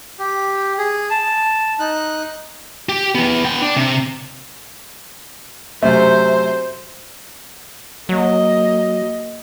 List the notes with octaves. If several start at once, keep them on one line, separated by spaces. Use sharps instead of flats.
G4
G#4
A5
D#4 F#6
G4
E3 B3
B3 G5
D4
C3
F#2 C3 A3 C5
F#3 A#3 D#5